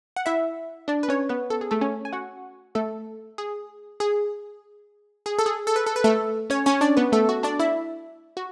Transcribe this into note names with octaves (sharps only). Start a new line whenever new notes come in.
F#5
E4 E5
D4 D5
B4
C#4 C#5
B3 B4
A4
G#4
A3 A4
C#4 C#5
G#5
F#4 F#5
A3 A4
G#4
G#4
G#4
A4
G#4
A4
B4
A4
B4
A3 A4
C#4 C#5
C#4 C#5
D4 D5
B3 B4
A3 A4
F#4
D4 D5
E4 E5
F#4